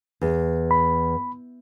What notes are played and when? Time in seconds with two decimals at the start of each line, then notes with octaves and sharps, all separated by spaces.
0.21 E2
0.71 B5